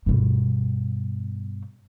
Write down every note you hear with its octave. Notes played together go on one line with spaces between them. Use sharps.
G2 B2